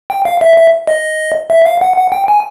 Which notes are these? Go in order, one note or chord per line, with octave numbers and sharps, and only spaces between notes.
G5
F5
E5
E5
D#5
E5
F5
F#5
F#5
G5
G#5